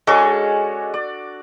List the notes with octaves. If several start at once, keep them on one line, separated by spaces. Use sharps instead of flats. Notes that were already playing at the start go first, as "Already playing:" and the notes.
G#3 C#4 D4 F#4 A4
D5